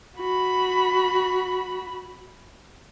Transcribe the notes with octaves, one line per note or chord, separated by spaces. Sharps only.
F#4 B5